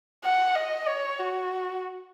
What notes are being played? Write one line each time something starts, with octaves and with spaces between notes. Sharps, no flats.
F#5
D#5
C#5
F#4